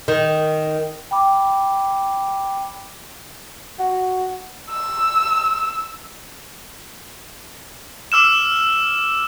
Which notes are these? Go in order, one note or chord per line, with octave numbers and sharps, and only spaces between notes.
D#3
G5 B5 D6
F#4
E6
D6 E6 F6 E7